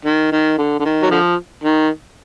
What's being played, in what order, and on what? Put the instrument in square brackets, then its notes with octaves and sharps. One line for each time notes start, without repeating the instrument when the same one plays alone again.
[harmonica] D#3
D#3
D3
D3
D#3
F#3
D3 F3
D#3